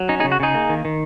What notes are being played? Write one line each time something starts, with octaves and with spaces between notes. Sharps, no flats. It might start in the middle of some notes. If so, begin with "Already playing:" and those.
Already playing: F#3
C#4 D#4
D#4 G#4
C#3
F#4
C#3 D#4 G#4
A#3
D#3
D#3